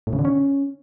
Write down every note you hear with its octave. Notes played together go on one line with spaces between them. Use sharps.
A2
C#3
D3
C#4